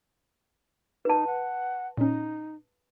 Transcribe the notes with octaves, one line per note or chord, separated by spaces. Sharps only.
D#4 B4 A5
F#5
A#2 C#4 D#4